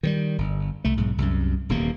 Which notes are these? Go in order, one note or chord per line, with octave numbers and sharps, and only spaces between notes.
D#3 E3 G3
G1
C2 A3
B1 G#2
C2 F#2
D#1 E2 C3 A#3